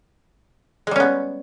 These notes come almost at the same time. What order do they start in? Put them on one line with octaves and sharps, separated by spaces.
G#3 G3 C#4 B3